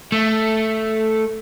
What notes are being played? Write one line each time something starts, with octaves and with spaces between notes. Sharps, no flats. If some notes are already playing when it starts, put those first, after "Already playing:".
A3